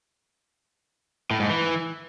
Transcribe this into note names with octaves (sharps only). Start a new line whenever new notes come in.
A2
G#2
E3